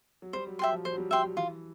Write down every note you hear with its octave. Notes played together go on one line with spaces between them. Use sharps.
F#3
G3 C5
F#3
F#3 E5 G5 C6
F3
F3 C5
F#3
G3
G3 E5 G5 C6
F#3
E3 F4